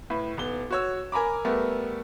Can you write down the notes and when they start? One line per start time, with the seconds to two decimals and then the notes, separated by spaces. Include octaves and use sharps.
0.10 A2 B4
0.37 D#1 B3 G7
0.71 F#4 C#5 E6
1.12 A#4 G#5 A#5 B5 D6
1.45 G3 A3 B3 A#4